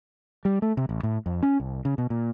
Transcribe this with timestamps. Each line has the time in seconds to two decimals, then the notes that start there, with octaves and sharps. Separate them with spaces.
0.45 G3
0.62 A3
0.77 C3
0.89 A1
1.03 A2
1.26 F2
1.43 C#4
1.60 C2
1.85 C#3
1.98 B2
2.10 A#2